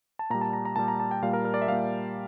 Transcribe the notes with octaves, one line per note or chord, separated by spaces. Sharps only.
A5
A#2 G3 A#5
A5
A#5
A#5
A#2 G3 A5
A#5
A5
G5
A#2 G3 F5
A#4
A#4
D5
E5
A#2 G3 F5